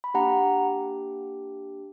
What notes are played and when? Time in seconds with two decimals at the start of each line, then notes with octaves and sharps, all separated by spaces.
0.04 B5
0.14 A#3 D4 G4 F#5 A#5